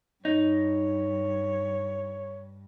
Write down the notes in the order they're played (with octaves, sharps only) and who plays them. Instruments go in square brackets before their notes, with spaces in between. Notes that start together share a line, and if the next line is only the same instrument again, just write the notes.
[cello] G2 [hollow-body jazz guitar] D#4 [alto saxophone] C#5